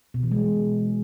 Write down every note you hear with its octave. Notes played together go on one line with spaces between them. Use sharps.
B2
E3
G#3